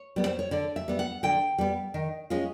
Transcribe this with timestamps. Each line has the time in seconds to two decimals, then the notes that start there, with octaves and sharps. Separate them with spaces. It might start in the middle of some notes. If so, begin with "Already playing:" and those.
Already playing: C#5
0.16 G3 B3
0.26 C5
0.39 C#5
0.51 D3 D5
0.76 E5
0.88 G3 B3
0.99 F#5
1.23 D3 G5
1.58 G3 B3
1.94 D#3
2.30 G#3 C#4 F4